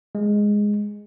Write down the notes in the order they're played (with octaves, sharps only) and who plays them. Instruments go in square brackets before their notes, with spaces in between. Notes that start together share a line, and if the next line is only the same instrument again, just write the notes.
[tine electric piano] G#3